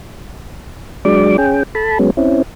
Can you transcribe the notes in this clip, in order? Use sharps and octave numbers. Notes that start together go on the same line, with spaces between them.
F#3 G#3 D4 D5 D6
C#4 G#4 G5
A4 A5 B5
F#3 G#3 B3 C#4
C4 C#4 E4